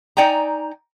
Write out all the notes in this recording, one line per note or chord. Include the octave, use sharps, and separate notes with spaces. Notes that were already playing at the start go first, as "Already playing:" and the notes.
D#4 D5 G5 G#5 A#5